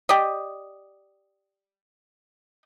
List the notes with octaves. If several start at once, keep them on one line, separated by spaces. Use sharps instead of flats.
G4 D5 D#5